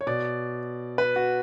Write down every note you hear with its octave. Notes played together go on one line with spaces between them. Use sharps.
C#5
B2 D5
B4
F#4